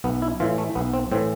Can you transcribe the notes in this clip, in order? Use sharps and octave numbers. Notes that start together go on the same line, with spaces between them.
B1 B3
E4
A2 E3 F4
A3
B1 B3
C4
A2 E3 C4